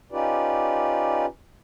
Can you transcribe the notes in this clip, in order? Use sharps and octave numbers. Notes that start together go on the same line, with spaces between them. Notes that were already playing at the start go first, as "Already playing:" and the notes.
C#4 D#4 F4 G4 B4 D5